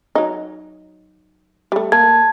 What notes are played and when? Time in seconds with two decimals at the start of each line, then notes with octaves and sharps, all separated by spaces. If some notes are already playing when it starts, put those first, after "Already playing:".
0.15 F#3 D#4
1.72 G3 A3
1.92 A#3 A5 G#6